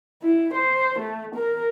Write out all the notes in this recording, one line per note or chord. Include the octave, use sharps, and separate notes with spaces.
E4
C5
A3
A#4